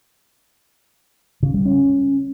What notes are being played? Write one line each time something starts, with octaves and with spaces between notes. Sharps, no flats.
C#3
G3
C#4